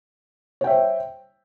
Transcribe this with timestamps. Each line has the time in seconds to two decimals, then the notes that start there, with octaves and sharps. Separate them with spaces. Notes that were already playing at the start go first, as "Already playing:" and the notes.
0.61 C#5
0.64 G5
0.67 E5
0.70 C5